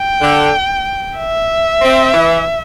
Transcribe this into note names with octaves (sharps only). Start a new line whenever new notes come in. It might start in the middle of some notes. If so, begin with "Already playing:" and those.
Already playing: G5
D3
E5
C4
E3